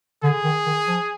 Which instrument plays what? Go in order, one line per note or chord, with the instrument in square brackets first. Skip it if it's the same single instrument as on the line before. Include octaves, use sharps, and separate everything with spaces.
[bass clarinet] D3 [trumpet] G#4
[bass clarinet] D#3
D#3
F3